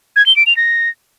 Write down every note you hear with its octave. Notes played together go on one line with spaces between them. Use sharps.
G#6
G7
D7
F7
A#6